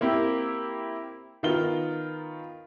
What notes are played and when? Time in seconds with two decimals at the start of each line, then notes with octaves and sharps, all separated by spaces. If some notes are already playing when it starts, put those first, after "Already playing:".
0.01 A#3 C4 E4 G4
1.43 D#3 B3 F4 A#4 G7